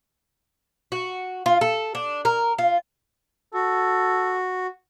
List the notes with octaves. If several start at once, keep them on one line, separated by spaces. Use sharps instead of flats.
F#4
F4
A4
D4
A#4
F4
F#4 A4